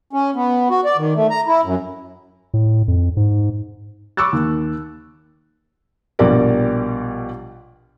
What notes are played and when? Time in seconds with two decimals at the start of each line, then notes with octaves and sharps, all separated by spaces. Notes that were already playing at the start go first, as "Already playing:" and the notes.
0.13 C#4
0.36 B3
0.70 F#4
0.85 D5
0.98 D#3
1.16 A3
1.30 A#5
1.48 E4
1.65 F#2
2.54 A2
2.88 F2
3.17 G#2
4.17 B5 C#6 D6 E6 F#6 A6
4.33 D#2
6.19 A#1 B2 G3 G4 A#4 D5